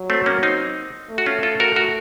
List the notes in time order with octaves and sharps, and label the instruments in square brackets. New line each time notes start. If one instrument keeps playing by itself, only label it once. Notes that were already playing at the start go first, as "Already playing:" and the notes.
Already playing: [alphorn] F#3
[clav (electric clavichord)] A3 C4
A#3 C#4
C4 D#4
[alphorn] A3
[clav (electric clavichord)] F#4
C#4 F4
F4 A4
F#4 A#4
F#4 A#4